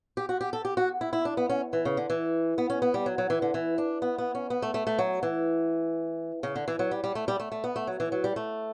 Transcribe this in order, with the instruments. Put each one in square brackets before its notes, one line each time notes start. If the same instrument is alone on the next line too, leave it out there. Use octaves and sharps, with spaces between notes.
[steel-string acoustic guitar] G4
F#4
G4
A4
G4
F#4
E4
E4
D4
B3
C#4
E3
C#3
D3
E3
B3
C#4
B3
G3
F#3
F#3
E3
D3
E3
D4
B3
B3
C#4
B3
A3
A3
A3
F#3
E3
C#3
D3
E3
F#3
G3
G3
A3
G3
A3
A3
B3
A3
F#3
E3
F#3
G3
A3